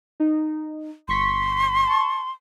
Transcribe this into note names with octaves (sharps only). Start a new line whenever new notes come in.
D#4
G1 C6 C#6 B6
A5 C#6